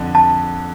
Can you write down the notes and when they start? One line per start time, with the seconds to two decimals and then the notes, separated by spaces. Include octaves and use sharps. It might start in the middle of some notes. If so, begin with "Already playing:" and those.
Already playing: F2 D3
0.15 A5